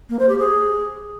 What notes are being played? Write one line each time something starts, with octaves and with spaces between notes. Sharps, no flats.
A#3
C5
G4
G#4